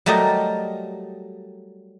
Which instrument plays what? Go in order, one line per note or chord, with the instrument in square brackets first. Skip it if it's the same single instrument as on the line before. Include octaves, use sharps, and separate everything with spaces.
[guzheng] F#3 G3 A3 G4 A#4 D#5